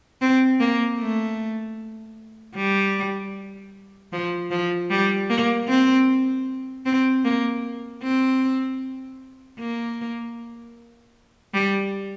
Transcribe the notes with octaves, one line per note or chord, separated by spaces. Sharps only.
C4
A#3
A3
G3
F3
F3
G3
A#3
C4
C4
A#3
C4
A#3
G3